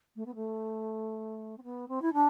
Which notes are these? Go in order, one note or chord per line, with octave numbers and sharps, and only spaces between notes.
A3
B3
A3
C4
B3
C4
E4
D4